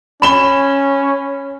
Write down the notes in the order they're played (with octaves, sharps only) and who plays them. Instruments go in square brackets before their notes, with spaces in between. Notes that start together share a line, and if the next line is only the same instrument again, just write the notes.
[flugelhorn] C#4 [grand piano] B5 E7 G7